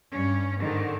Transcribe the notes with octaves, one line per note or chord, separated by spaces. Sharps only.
G2 C#4
G#2 D3 D#3